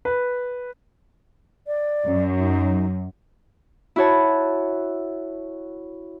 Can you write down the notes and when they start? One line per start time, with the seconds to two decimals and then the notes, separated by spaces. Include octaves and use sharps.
0.05 B4
1.67 D5
2.04 F#2
2.38 D#4
3.96 E4 F#4 C#5 A5